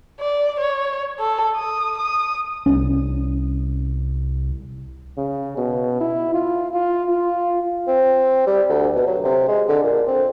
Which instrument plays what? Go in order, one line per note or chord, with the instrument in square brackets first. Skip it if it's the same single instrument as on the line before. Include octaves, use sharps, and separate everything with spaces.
[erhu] D5
C#5
A4
D#6
D#6
[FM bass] C2 [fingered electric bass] C#4
[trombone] C#3
B2
E4
F4
F4
F4
[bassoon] C4
G3
D2
B2
F#3
C3
G#3
D3
A#2
C4